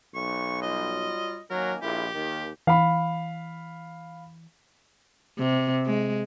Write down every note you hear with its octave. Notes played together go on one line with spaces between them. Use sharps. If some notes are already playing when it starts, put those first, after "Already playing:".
B1 C#6
F#3 G3 F4 D#5
D#3 F#3 A#3 C#4 A#4
A#1 E4 G4 G#4 A#4
D#2 D#3
E3 F5 B5
C3
G#3